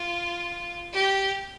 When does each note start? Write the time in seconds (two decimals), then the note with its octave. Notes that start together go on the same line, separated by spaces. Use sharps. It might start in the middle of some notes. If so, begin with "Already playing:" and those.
Already playing: F4
0.93 G4